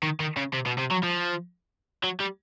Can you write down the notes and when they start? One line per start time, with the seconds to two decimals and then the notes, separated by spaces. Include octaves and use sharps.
0.03 D#3
0.20 D#3
0.37 C#3
0.53 C3
0.66 B2
0.78 C3
0.91 F#3
1.03 F3
2.03 F#3
2.20 G3